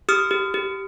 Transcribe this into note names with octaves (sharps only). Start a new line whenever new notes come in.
G4 D#6 F6
G4
G4